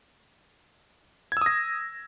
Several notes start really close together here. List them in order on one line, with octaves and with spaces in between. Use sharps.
G#6 E6 D#6 A#6